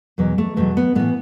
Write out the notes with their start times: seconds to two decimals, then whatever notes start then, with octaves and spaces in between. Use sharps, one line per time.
0.18 E2 B2 F#3
0.38 A3
0.56 E2 B2 F#3 A3
0.77 B3
0.95 A2 E3 B3